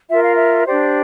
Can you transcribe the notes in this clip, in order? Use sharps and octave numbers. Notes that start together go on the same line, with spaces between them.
F4 A#4 E5
F5
E5
D4 G4 C5 D5